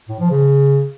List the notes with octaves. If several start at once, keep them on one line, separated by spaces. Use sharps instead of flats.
A2
F3
C#3